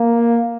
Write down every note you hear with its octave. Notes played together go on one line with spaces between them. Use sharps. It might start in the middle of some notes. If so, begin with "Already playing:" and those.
Already playing: A#3